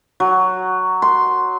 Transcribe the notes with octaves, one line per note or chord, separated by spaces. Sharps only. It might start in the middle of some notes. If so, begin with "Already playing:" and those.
F#3
C6